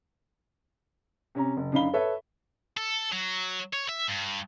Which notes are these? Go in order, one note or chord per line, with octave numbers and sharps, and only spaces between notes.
C3 C#4 A#5
F#1
F#2 D3 D#4 F5 B5 G7
A4 B4 C#5 E5
A4
F#3
C#5
E5
G2